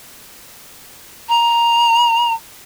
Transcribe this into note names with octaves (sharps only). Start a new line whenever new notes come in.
A#5